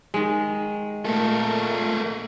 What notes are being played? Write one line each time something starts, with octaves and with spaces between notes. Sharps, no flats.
D#3 G#3
A#2 A3 A#3 A4 A#4